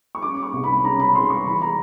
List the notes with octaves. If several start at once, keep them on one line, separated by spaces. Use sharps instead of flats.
C#6
C#4 D6
C#6
C2
B5
C#4 A#5
B5
C2 C6
C#6
E3 B5
A#5